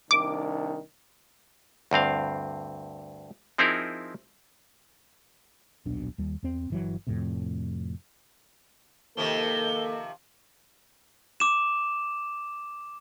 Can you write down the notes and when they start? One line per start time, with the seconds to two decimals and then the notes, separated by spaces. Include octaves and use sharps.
0.11 C2 D#3 D4 D6
1.91 D2 G2 C4 F5
3.58 F3 C4 D#4 E4 G#4 A#4
5.85 D#1 B1 B2 D4
6.18 D#2 G3
6.43 E2 C4
6.70 G1 E3 F#3
7.07 F2 A2 C3
9.17 C3 D#3 F3 A#3 A4 G7
11.40 D6 E7